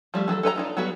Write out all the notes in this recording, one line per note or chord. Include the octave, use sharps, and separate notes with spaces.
F3 G3 A3
E3 F#3 A4
A4 B4 C#5 A#5
D4 D#4 F4
F#3 G3 B3 F#4 B4